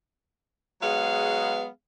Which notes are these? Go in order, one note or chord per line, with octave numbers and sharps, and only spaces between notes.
F#3 G#3 B3 G#4 F5